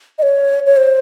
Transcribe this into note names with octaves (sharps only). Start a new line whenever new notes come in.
D#5
C#5
C#5
C5